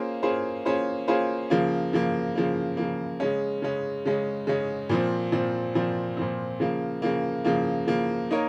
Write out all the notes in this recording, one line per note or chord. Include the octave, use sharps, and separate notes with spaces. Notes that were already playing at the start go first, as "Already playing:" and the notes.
Already playing: A#3 C#4 F4 G#4 C5
A#3 C#4 F4 G#4 C5
A#3 C#4 F4 G#4 C5
A#3 C#4 F4 G#4 C5
C#3 F3 A#3
C#3 F3 A#3
C#3 F3 A#3
C#3 F3 A#3
C#3 G#3 C#4
C#3 G#3 C#4
C#3 G#3 C#4
C#3 G#3 C#4
A#2 F3 C4
A#2 F3 C4
A#2 F3 C4
A#2 F3 C4
C#3 F3 A#3
C#3 F3 A#3
C#3 F3 A#3
C#3 F3 A#3
A#3 D#4 A#4 C#5